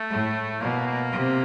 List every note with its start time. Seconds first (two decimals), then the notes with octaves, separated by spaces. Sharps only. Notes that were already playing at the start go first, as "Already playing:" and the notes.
Already playing: A3
0.11 A2
0.61 B2 A#3
0.87 A#3
1.12 C3